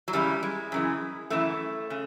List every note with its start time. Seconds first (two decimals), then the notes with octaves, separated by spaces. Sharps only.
0.08 F#3
0.13 F#2 C#3 E3 G3
0.43 G#3
0.72 F#2 C#3 E3
1.30 F#2 C#3 E3 A3
1.90 C#3